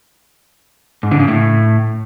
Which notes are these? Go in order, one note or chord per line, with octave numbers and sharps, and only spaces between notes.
G#2
D3
C#3
A2